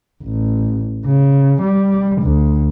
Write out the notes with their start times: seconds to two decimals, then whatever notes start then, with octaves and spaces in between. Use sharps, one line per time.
0.24 A1
1.06 C#3
1.62 G3
2.22 D2